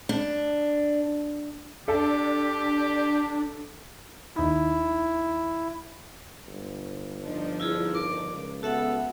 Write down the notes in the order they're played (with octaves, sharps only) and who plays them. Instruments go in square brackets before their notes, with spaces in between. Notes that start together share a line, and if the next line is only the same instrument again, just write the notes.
[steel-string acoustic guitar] D4
[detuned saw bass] D4 [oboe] G4 [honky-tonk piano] A4
[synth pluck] D#2 D#4 [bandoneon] E4
[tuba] G1
[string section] F3 D4 D#4
[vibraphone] E4 F4 G#4
[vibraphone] A#4 [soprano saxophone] D6
[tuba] C#2
[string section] B3 [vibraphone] F#4 E5 F#5 [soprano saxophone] A4